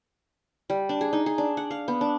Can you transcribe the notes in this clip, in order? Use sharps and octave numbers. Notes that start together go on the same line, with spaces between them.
G3
D4
G#4
D#4
G#4
D4
F#5
F5
B3
D4